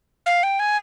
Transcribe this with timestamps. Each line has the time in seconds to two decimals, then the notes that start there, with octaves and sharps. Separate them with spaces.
0.26 F5
0.43 G5
0.60 G#5